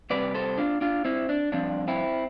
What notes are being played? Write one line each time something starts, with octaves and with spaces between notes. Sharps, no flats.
C3 G3 C4 B4 D5
A4 C5
D4 F4
D4 F4
C4 E4
D4
G2 F3 C4 D4
C4 E4